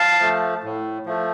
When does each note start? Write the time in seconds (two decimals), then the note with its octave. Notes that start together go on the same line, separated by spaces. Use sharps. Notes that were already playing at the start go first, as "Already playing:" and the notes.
Already playing: F5 A5
0.20 F3 A3
0.64 A2
1.06 F3 A3